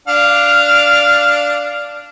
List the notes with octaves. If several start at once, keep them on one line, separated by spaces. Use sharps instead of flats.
D4 F5 F6